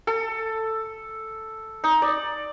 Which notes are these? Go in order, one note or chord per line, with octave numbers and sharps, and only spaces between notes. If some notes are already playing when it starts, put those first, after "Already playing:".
A4
D#4
D5